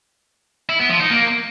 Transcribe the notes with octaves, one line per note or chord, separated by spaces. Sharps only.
E4
B3
F3
D#4
A#3